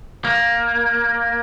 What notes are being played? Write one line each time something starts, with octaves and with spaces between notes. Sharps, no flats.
A#3